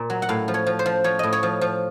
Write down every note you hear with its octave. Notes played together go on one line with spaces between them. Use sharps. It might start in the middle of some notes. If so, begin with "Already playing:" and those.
Already playing: A#2
F#3
F#5
A2 F5
F3
C#5
F3
C5
F3
F3 C#5
A2 D#5
C#5
F3
F3